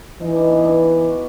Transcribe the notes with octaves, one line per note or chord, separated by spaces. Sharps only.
E3 D#4
D4
B3
D4
F#4